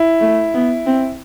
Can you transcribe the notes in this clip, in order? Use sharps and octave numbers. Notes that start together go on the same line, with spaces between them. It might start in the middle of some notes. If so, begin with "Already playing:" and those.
Already playing: E4
A3
B3
C4